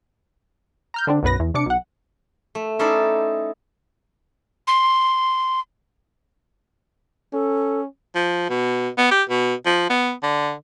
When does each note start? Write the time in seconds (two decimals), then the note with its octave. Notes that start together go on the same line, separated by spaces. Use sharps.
0.94 A#5 F6 G6
1.07 D3 C4 D4
1.23 B1 F#2 B3 B4 A#6
1.40 E2
1.54 C3 D4 D6 C#7
1.66 B1 F#5
2.55 A3
2.79 C#4 D#4 E4 A4 C5 D5
4.67 C6
7.33 C#4 A4
8.15 F3
8.49 B2
8.98 B3
9.11 G4
9.29 B2
9.66 F3
9.90 B3
10.23 D3